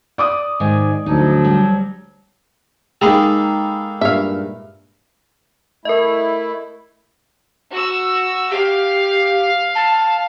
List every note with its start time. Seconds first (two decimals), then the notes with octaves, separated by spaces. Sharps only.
0.18 D5 D6 D#6
0.60 G#2 D#3 G#5
1.06 D2 F3 F#3 D#4
1.45 G3
3.01 G#3 A#3 D#4 G#4 A4 G5 A#5 B5
4.01 G2 A#2 E5 F5
5.85 A3 E4 A#4 D#5
7.71 F#4 E6
8.51 G4 F5
9.75 A5